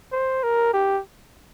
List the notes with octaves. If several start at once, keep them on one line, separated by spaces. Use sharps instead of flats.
C5
A#4
G4